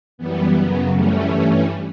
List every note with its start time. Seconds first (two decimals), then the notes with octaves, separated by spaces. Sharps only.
0.18 F#2 E3 G3 B3
0.55 F#2 C#3 F#3
0.93 F#2 E3 G3 A3 C#4
1.32 G2 E3 G3